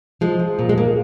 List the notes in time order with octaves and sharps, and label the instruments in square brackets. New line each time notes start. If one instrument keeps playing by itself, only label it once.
[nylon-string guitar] F3 G#3
F3
A#2
G#3
A#2 A#3